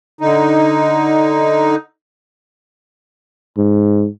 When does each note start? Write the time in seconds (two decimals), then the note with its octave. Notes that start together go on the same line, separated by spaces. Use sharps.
0.21 D3 D#4
3.58 G#2